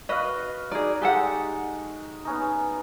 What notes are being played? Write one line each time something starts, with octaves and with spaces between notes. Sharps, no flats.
F#4 B4 D#5 F5
D#4 G#4 D5 D#5
G#3 G4 A4 F#5
B3 C#4 D#4